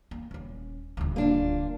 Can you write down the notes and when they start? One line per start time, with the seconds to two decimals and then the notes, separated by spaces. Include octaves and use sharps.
0.11 A#3
0.31 D#1 C#4
0.97 D#1 D2
1.16 A#3 D4 F4